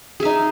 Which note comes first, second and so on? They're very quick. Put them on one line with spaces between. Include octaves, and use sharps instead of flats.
G#4 E5 D#4